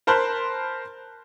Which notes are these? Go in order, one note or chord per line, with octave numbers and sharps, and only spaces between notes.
A#4 C5 A5 B5 C6 F#6